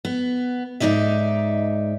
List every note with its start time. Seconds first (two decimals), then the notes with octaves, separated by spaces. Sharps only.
0.05 B3
0.80 G#2 B2 D#4 D5 E5